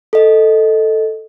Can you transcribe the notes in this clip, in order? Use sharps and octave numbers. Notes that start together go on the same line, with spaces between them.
A4 D#5